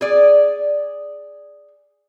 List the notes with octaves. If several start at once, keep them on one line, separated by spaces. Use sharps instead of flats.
G#4 D5